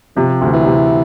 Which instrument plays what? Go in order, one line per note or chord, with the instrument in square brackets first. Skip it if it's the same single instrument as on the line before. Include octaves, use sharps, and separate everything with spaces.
[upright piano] C3 [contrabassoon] F3
[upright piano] D2
[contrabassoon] E3
[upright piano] C3